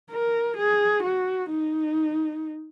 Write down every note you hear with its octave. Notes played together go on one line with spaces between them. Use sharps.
A#4
G#4
F#4
D#4